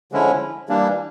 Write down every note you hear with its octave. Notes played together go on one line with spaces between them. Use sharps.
D3 F3 G#3 C#4 E4
E3 G3 A#3 D4